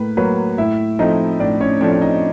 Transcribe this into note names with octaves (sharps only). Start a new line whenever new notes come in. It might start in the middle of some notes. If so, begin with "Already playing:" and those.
Already playing: A2 A#3 B4
F#3 A#3 B4
A2 E4 E5
F3 A3 C4 D#4 D#5
A2 D4 D5
C#4 C#5
F3 A3 C4 D4 D5
D5
D#4 D#5